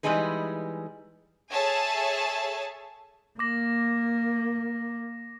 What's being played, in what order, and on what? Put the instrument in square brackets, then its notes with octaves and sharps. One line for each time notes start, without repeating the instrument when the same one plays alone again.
[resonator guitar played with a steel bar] E3 G3 G#3 D#4 G#4 B4
[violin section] G#4 A4 C#5 E5 G#5 A5
[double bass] A#3 [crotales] D6 A#6